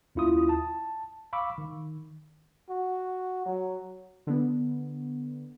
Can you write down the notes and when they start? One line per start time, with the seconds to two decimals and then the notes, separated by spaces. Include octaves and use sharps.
0.15 D#2 C#4 E4 F4 D#6
0.49 A5
1.33 F5 B5 C#6 D6 E6
1.58 D#3
2.69 F#4
3.46 F#3
4.27 D3 B3